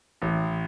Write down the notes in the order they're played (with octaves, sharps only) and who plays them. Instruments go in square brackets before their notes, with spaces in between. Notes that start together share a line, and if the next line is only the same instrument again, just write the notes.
[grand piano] A1